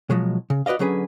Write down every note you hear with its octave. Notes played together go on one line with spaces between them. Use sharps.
B2 F3 F#3 G#3
C#3
F#4 B4 D5 D#5 F5
D3 F#3 C#4 G#4 B4